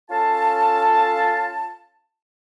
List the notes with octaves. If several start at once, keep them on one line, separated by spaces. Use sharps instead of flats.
C#4 F4 A4 F5 A5